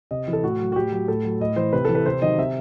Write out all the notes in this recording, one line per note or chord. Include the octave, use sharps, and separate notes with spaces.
C3 D#5
E3
A4
A2 F#4
F#3
F#4
A2 G4
F#3
A2 A4
F#3
A2 D#5
E3 C5
C3 B4
E3 A4
B4
C3 C5
D#3 F#3 D#5
C3 E5